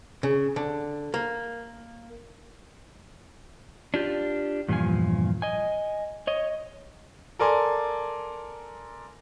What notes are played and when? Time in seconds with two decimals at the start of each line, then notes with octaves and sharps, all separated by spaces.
0.23 C#3
0.56 D3
1.14 A#3
3.94 D4 F4 G4
4.68 E2 G2 A#2 F3 G#5
5.42 D#5 G#5
6.27 C#5 D#5
7.39 A4 A#4 D5 G#5 C6